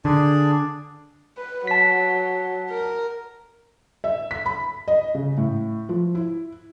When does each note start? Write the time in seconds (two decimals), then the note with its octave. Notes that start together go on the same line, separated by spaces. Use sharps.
0.05 D3 D4 G#4 D5
1.37 B4
1.67 F#3 A5 B6
2.70 A#4
4.04 E5
4.31 B6
4.46 B5
4.88 D#5
5.15 C#3
5.37 A2
5.89 F3
6.15 E4